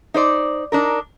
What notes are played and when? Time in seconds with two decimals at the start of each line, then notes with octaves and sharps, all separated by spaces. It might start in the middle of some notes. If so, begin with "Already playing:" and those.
0.14 D#4 C5 D5
0.72 D4 D#4 A#4